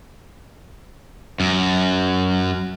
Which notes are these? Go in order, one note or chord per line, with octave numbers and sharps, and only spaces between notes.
F#2